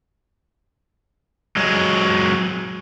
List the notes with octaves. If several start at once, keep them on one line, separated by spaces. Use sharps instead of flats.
F#3 G#3